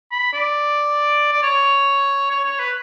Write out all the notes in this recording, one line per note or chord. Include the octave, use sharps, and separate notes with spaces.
B5
D5
D5
C#5
C#5
C#5
B4